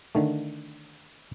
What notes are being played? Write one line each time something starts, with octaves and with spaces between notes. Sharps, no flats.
D3 D#3 A3